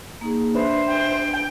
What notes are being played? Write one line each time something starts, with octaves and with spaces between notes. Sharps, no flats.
A#3 D#4 G#4
D4 B4 C5 E5
G5